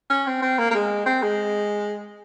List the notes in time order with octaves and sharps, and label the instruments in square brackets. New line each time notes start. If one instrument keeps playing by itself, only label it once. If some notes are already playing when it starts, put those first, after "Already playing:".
[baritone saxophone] C#4
C4
C4
A#3
A#3
G#3
C4
G#3